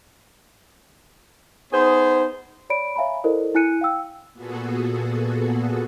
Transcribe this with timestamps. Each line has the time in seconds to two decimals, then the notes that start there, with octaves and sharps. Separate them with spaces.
1.72 B3 D#4 G#4 C5
2.70 C#5 D5 B5 D7
2.96 C#5 E5 F5 G#5 A#5 B5
3.24 E4 A4 A#4 C5 D5 D#5
3.55 E4 G#5 F#6 C#7 D#7
3.81 F5 G5 E6
4.33 A#2 B3 F#4 G#4 A4